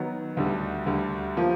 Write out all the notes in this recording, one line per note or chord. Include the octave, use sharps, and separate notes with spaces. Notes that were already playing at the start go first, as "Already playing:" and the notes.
Already playing: D#3 F#3 B3
D2 D3 G3
D2 D3 G3
F3 A#3